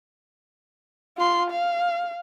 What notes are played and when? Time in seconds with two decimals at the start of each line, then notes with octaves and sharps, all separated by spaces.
1.17 F4 C6
1.50 F5